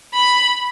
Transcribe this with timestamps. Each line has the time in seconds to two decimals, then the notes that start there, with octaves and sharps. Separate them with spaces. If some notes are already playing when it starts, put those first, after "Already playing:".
0.14 B5